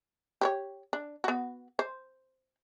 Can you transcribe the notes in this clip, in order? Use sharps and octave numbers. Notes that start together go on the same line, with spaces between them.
G4 C5 C#5
D4
B3 F#4
C5